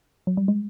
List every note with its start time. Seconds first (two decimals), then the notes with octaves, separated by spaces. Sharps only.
0.27 F#3
0.37 G3
0.48 G#3